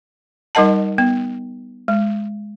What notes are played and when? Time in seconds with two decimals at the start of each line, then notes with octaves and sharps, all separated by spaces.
0.55 G3 D#4 A#4 D#5 F#5 A5
0.98 B3
1.88 G#3